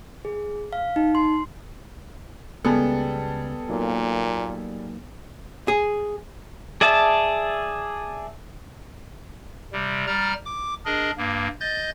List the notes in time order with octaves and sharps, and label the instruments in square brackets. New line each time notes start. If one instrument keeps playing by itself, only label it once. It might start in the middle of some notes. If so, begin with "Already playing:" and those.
[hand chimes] G#4
F5
D#4
C6
[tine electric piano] C#2 C#3 G#3 [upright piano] G3 G#4 A4 [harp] B3
[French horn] A#2 [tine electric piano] F#3 A#3 D#4
[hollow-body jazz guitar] G#4
[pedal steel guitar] G#4 D5 E5 A5
[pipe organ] C3 G3
G3 A#5 F6 A6
D6
D4 G#4 A#4 D#5
G2 A#3
D#5 G6 A6